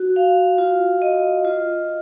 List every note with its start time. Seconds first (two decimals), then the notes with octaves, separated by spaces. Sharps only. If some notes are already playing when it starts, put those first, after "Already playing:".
Already playing: F#4
0.16 F5
0.58 F4
1.02 D#5
1.45 F4